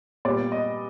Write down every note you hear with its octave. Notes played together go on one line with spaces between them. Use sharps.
A#2 G3 B3 D5
D#5